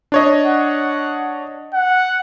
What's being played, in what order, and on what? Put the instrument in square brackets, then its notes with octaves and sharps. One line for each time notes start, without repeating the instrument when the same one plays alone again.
[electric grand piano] D4 C#5 D#5
[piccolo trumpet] F#5
F#5